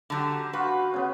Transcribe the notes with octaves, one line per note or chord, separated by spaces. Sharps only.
D3 F#3 G4 A4
F4 F#4 B4
C#3 B3